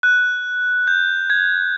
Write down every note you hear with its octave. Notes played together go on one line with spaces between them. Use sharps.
F#6
G6
G#6